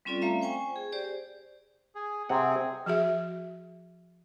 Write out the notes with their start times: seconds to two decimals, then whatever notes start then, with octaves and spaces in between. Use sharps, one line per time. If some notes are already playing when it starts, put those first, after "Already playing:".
0.05 G3 C4 C#4 F4 A4 D5
0.21 A3 C4 E5 F5 A#5
0.42 C5 G5 G#5 C#6
0.76 G#4
0.92 G4 C5 D5
1.95 G#4
2.29 C3 C4 G#4 F#5
2.86 F3 F#4 G#4 E5